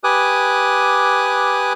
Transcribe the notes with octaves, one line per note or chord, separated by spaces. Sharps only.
G4 B4 G#5 D6 D#6 F#6